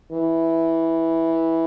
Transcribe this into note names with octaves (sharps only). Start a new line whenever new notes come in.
E3